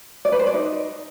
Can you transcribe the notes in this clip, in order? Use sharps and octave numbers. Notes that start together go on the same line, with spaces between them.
D5
B4
C5
D5
D#4